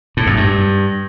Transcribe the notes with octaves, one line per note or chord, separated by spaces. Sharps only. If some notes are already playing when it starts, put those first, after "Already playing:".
A2
F#2
G2